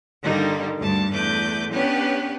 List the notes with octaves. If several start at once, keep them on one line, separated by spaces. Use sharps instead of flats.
G2 D3 D#3 G3 A#3 D#4
D2 G2 G3 A5
E2 A3 B4 D6 G6
B3 C#4 D4 G4 B4 C#5